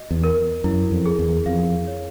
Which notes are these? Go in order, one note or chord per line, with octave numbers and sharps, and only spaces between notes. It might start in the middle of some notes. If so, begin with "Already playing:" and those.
Already playing: F#4 D#5
E2
A#4
F#2 E4
F2
G#4
E2
F2 F5
C#5